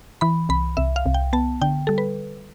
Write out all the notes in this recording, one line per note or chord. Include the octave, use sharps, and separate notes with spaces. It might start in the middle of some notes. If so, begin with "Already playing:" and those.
E3 B5
C2 B5
C2 E5
F5
C2
G5
B3 A5
D3 G5
G3 A4
B4